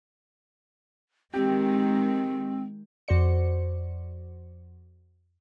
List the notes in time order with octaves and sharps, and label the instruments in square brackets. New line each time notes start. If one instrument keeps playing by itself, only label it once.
[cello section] D#3 G#3 [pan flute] C4 [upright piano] G4
[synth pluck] F2 F#4 C5 D5 C#7